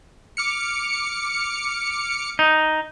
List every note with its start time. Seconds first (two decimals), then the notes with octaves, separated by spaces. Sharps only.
0.37 D6 F6 C#7
2.39 D#4